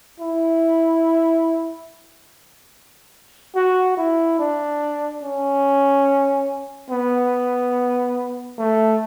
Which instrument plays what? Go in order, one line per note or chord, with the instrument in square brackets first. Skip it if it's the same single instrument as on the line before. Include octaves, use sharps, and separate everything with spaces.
[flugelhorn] E4
F#4
E4
D4
C#4
B3
A3